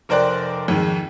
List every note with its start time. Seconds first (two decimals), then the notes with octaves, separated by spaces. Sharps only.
0.09 F1 A#4 C5 D5 G5 F#6
0.68 F2 G#2 D#3